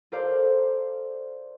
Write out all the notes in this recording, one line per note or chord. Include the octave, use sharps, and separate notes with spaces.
F4 A4 A#4 C5 D5 F5